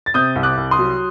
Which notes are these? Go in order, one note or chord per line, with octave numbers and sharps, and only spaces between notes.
A6
C3 D#6 G6
C2
D6 F#6
C2
C6 D#6
F#3